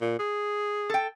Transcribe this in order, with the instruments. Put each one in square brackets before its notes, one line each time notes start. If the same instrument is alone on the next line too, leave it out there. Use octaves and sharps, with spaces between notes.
[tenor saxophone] A#2
G#4
[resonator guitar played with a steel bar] A4 G5